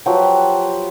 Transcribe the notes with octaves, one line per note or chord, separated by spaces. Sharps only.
F3 F#3 G4 B4